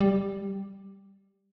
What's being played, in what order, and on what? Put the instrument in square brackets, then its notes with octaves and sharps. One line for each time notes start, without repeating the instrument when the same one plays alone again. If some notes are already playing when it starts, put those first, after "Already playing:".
[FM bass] G3